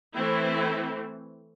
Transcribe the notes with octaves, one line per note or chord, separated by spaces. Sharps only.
E3 A3 C4 E4